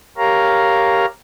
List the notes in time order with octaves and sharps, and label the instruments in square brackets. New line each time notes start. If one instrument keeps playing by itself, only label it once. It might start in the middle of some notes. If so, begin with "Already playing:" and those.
[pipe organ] G4 A#4 C#5 F5 A#5